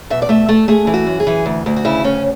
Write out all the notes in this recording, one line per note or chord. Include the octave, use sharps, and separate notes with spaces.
B2 E5
D5
A3 E5
A3 A4
A3 G#4
E3
F#4
F#2
G#4
E3
D2
D2 F#4
F#4
C#3 E4
D2 C#4